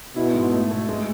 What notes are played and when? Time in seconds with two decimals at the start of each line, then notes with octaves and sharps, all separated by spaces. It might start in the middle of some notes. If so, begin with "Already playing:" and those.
0.16 B2 E4
0.34 G#2
0.52 A3
0.71 A3
0.89 G#3